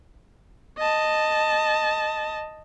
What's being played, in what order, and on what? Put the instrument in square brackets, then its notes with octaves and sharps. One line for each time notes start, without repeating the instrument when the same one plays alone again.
[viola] D#5 A5